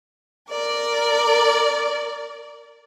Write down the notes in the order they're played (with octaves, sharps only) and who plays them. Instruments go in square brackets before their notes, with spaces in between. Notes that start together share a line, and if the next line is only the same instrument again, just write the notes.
[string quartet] A#4 D5